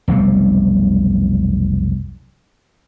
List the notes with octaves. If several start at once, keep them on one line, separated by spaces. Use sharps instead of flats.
F1 B1 C3 G3